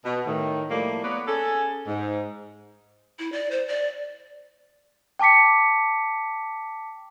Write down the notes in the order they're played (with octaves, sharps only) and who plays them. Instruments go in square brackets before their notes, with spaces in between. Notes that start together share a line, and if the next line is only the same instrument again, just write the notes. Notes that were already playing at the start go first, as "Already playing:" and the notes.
[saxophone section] B2
A2 D#3
A2 F3 G3 A3 A#3
A#3 B3 B4 C#5 D5
C#4 G#4 A4
G#2
[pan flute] E4
D5
C5
D5
[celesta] G5 A5 D6 B6 C#7